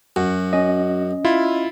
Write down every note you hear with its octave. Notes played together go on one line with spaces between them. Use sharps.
F#2 F#4
C#4 D#5
E4 F4